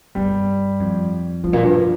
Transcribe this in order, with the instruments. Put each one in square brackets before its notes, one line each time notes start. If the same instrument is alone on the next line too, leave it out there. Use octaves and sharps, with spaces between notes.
[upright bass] G2 [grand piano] G3
[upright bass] F2
[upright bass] G2 [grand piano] F3
[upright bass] A#2
G2